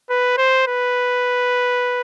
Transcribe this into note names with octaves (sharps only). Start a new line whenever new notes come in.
B4
C5
B4